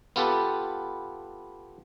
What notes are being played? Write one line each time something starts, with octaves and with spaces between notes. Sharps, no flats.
B3 F4 G4 A4 B4